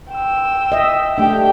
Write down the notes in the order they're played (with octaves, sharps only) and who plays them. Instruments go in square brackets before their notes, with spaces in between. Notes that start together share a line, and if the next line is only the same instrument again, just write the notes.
[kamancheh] G5 E6
[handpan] D#5 E5
[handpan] A3 D4 [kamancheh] G4 G5